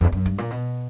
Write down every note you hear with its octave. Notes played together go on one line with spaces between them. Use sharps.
E2
F#2
G2
A#2
B2